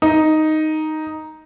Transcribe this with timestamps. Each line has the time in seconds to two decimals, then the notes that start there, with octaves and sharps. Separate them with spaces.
0.02 D#4